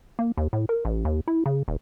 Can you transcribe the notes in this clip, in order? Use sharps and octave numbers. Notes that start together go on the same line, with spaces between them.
A#3
D#2
A2
A#4
A1
D#2
E4
C#3
D#1